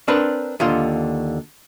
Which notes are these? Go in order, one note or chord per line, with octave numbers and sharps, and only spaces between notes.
C4 D4 A#4 B4
D#2 D3 F4